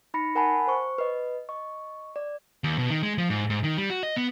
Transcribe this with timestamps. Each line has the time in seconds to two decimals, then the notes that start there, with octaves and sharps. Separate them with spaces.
0.14 D#4 B5 A#6 C#7
0.35 A#4 F#5 G#5 A5 B5
0.67 C5 C#6
0.98 B4 D#5
1.49 D#5 C#6
2.16 D5
2.64 D#2
2.79 B2
2.90 D#3
3.03 G#3
3.18 F3
3.30 G#2
3.50 G#2
3.64 D#3
3.78 G3
3.90 F#4
4.03 D#5
4.16 B3